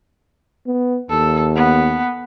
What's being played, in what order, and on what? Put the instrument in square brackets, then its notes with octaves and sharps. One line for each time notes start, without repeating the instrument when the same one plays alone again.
[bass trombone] B3
[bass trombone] D#2 [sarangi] A4
[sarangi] B3